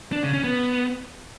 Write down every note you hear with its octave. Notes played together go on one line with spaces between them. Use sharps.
D4
C#3
C#4
B3